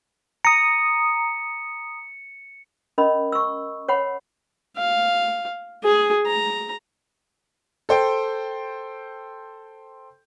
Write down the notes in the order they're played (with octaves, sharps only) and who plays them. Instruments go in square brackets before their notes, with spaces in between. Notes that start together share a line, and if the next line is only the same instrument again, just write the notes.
[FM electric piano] A#5 D#6 [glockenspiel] C#7
[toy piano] C#4 A#4 D#5 B5
C#6 E6
C#5 F#5 B5
[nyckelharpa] F5
G#4
A#5
[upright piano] A4 C5 G5